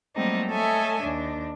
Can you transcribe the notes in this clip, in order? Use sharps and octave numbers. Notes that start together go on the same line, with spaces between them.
F#3 G3 A3 A#3 C4 D#4
A3 A4 C#5 D#5 E5 G#5
D#2 D4